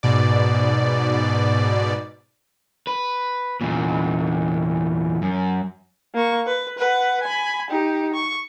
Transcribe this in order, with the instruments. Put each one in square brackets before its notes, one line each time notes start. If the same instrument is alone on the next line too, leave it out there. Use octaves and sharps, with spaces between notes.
[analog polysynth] G#2 B2 D5
[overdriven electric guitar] B4
E2 A#2
F#2
[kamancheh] A#3 C#6
B4
B4 F#5
G#5 B5
D#4 G4
C#6